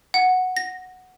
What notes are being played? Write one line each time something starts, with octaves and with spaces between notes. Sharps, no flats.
F#5
A#6